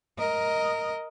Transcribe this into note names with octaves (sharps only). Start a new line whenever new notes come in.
A#4 D#5